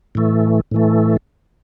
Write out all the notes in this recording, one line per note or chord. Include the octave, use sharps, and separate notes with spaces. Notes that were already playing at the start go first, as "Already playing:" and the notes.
A2 E3 A3
A2 E3 A3